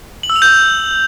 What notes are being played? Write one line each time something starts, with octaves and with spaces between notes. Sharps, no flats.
F#7
E6
F7
G6